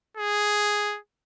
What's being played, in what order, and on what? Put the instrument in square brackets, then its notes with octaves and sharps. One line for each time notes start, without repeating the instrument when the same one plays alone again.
[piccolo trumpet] G#4